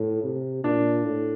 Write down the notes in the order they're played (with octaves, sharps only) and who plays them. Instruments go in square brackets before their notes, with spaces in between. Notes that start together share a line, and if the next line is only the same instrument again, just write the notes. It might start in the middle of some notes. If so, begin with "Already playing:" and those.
Already playing: [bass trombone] A2
C3
[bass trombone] A#2 [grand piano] D4
[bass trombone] A2